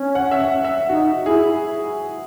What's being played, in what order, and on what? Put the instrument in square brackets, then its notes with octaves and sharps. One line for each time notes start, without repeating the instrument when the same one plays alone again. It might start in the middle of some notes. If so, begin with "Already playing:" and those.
Already playing: [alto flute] C#4
[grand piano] F#5
E5
F#5
E5
[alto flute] D#4 [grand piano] F#4
[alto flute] E4 [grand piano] G#4